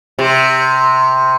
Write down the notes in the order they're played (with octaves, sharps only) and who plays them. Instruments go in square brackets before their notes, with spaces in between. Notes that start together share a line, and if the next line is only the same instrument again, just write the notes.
[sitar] C3